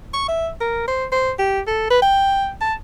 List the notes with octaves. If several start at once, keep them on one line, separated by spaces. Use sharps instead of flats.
C#6
E5
A#4
C5
C5
G4
A4
B4
G5
A5